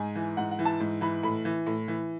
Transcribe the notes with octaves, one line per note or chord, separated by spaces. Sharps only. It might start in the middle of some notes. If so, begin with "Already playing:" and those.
Already playing: G#2 G#5
E3
G#2 F#5
F#5
E3
A5
G#2
E3 B5
A2 B5
E3
A2
E3